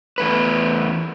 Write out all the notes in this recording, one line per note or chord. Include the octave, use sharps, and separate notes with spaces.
E2 A3 B4